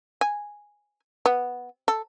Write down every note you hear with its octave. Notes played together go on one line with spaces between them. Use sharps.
G#5
B3
A4